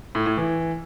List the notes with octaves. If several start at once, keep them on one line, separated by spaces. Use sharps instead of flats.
A2
A2
E3